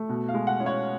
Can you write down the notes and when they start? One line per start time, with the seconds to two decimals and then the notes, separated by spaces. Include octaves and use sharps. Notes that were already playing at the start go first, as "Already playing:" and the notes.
Already playing: A3
0.09 B2
0.29 F5
0.34 G#3
0.47 F#5
0.60 C#4
0.66 C#5